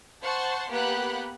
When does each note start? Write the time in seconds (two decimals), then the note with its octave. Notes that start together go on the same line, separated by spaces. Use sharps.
0.23 C5 F#5 A5 C6 C#6
0.70 A#3 B3 G4 F#5 B5 F#6